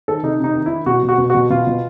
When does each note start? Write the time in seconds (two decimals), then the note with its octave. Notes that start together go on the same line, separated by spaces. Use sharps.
0.08 D#3 A4
0.23 C3 D#4
0.40 C3 D#4
0.55 D#3
0.66 D#3 E4
0.86 B2 F#4
1.03 B2
1.09 F#4
1.18 B2
1.30 B2 F#4
1.50 B2 F4
1.67 B2